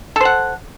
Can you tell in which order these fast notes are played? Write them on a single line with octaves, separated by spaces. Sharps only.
A4 C5 F#5